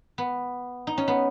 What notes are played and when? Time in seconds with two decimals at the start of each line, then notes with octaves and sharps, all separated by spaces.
0.18 B3
0.87 D#4
0.98 C#4
1.08 B3